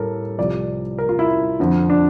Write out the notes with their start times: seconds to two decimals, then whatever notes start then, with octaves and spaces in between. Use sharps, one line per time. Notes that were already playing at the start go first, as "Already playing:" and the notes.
Already playing: A2 G3 A4 A#4
0.38 C2 C3 F3 D5
0.98 A#4
1.09 F4
1.19 E4
1.59 F2 D3 F3
1.90 D4